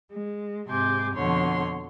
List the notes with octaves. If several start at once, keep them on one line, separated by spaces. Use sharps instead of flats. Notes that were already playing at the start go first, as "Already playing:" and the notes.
G#3
G#2 C3 G#5 C6 D6 G6
F2 B2 D3 F3 C#5 C6